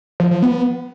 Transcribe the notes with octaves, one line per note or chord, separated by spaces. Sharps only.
F3
F3
B3